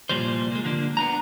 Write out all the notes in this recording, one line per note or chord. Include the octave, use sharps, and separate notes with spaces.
C2 A#2 F3 G3 C5
G#3 A#3
D3 F3 A#3 D4
B3 D4 A#5